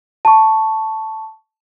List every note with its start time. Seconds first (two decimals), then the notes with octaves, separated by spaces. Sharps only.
0.25 A5 C#6